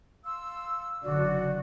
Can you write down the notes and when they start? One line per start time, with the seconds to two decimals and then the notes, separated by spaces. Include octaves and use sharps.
0.25 F5 C6 E6
1.04 F#1 D3 F#4 D5